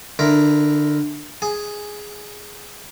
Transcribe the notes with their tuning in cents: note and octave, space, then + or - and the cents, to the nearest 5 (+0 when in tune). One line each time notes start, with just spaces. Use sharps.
D3 +20 E4 +0 A#4 +0
G#4 +0 G#5 +5